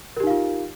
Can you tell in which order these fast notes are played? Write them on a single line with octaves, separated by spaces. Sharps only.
A#4 G4 D#4 F5 F4